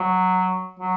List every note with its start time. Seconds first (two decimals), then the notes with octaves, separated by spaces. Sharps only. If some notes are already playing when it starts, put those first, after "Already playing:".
Already playing: F#3
0.79 F#3